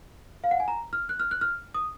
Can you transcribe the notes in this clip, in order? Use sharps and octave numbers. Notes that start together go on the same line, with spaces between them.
F5
F#5
G#5
A#5
F6
F#6
F6
F#6
F6
D#6